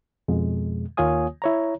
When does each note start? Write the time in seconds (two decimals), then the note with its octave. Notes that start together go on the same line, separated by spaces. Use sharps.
0.28 F2 B2 G#3
0.97 D#2 A#3 F4 C#5 G#5 D#6
1.42 E4 C#5 A#5